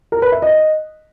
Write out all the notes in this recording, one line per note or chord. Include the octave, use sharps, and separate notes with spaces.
A#4
B4
E5
D#5